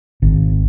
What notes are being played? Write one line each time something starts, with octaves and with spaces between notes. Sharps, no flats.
G#1